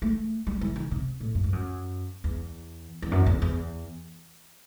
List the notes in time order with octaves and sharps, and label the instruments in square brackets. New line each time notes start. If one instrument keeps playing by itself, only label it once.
[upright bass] A3
G3
E3
D#3
C3
A2
F#2
G2
F#2
E2
E2
F#2
E2
E2